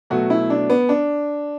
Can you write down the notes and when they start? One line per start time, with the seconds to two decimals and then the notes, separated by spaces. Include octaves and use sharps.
0.10 B2 F#3 A3 F#4
0.30 E4
0.50 D4
0.70 B3
0.89 D4